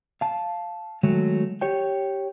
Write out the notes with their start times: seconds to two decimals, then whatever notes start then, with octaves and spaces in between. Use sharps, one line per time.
0.21 F5 A5
1.03 D#3 F#3 G#3 A3
1.61 G4 C#5 G5